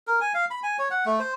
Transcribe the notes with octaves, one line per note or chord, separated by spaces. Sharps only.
A#4
G#5
F5
B5
G#5
C#5
F#5
A3
C5